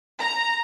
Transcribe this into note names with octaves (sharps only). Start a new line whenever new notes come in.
A#5